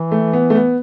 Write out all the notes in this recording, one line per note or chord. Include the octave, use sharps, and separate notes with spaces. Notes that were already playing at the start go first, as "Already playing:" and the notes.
Already playing: E3
A3
B3
A3
B3